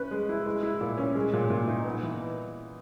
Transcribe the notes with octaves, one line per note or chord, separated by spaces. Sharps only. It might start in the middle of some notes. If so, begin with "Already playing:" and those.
Already playing: C#4 B4
G#3
E4
G#3
E4
A#2
C#4
G#3
A#2
A#2
D#4
B3
E3